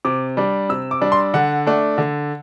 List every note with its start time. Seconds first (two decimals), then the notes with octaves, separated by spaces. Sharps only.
0.05 C3 D6
0.37 G3 D4
0.69 C3 E6
0.91 D6
1.01 G3 D4
1.12 C6
1.34 D3 F#5
1.66 A3 D4
1.98 D3